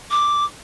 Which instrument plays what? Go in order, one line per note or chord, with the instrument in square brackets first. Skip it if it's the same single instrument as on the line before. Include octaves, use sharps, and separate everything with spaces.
[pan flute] D6